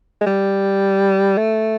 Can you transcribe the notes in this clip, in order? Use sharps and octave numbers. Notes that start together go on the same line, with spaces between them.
G#3
G3
A3